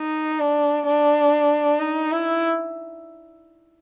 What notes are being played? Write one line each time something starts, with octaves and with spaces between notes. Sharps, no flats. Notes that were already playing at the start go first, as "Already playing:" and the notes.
Already playing: D#4
D4
D4
D#4
E4